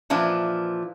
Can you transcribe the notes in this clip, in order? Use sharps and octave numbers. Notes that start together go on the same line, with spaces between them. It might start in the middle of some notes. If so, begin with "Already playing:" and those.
A#2 E3 F3 D4